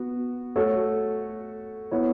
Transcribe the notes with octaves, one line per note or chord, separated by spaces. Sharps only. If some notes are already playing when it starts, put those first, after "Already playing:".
Already playing: B3 F#4
A3 F#4 A4 C#5
B3 E4 C#5